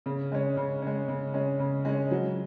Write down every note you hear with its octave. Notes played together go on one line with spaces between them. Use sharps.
C#3
G#3 C#4
C#3
G#3 C#4
C#3
G#3 C#4
C#3
G#3 C#4
F#3